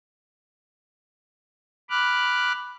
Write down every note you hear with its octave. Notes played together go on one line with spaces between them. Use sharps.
B5 D6 F6 F#6